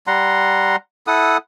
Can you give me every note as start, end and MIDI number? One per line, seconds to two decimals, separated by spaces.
0.07 0.76 55
0.07 0.76 78
0.07 0.76 82
0.07 0.76 84
1.07 1.37 64
1.07 1.37 69
1.07 1.37 78
1.07 1.37 87